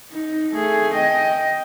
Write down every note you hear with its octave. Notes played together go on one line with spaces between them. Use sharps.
D#4
A3 G#4
D#5 G5